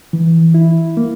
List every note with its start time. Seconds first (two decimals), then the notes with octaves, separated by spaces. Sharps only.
0.13 E3
0.54 E4
0.97 A#3